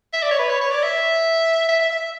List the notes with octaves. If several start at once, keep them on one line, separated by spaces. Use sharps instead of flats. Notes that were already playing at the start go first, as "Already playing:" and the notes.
E5
D5
C#5
B4
C#5
C#5
D5
E5
E5
E5
E5
E5